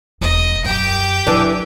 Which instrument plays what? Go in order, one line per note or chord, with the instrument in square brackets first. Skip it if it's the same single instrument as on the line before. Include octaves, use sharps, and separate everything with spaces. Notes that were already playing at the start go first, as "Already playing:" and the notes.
[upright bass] E1 [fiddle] D#5
[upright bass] F#2 [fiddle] G4 G5
[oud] E3 D4 [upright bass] F#3